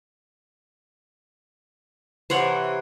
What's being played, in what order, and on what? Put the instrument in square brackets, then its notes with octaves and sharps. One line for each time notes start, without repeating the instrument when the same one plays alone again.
[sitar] C3 E3 [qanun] C5 C#5 F#5